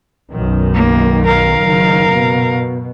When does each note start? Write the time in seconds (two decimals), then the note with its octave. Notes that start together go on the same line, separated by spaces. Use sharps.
0.31 B1 F#2 D#3
0.74 A#3
1.25 A#4 F5
1.62 F#1 D#3
2.07 B2